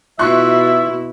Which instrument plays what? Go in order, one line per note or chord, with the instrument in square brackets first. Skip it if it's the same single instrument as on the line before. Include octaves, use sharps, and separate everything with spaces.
[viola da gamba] B2 E4 [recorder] F4 [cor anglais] E5 [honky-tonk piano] C6 C#6 F#6